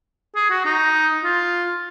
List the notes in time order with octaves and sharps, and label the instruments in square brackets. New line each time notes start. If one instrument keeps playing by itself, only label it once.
[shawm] G#4
F#4
D#4
F4